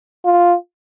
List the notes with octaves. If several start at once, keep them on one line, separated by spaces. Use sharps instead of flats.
F4